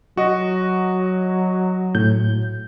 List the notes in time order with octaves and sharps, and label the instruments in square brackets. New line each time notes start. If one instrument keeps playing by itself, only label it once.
[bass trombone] F#3 [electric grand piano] F#4 D#5
[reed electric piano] A2 G6